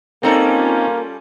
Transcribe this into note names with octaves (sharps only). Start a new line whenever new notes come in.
G3 A#3 C4 C#4 D#4 F4 A4 A#5